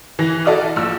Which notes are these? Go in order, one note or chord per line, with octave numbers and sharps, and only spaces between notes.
E3 A#6
F#4 A4 D5 E5 D#6 F6
A#1 E6